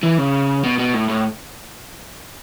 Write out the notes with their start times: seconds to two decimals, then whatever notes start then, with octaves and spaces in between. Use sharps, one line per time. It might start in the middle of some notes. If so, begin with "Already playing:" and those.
0.03 E3
0.18 C#3
0.64 B2
0.79 B2
0.94 A2
1.09 A2